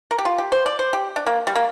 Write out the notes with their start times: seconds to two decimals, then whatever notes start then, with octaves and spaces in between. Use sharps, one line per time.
0.11 A#4
0.18 G4
0.25 F4
0.38 G4
0.52 C5
0.66 D5
0.79 C5
0.93 G4
1.16 D4
1.26 A#3
1.47 G3
1.55 A#3